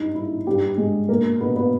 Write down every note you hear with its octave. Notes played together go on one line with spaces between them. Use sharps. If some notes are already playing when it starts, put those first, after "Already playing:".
Already playing: G2 G3 D#4
G3 E4
G2 G3 G4
G2 G#3 G#4
B2 A#3 A#4
B2 B3 B4
B3 B4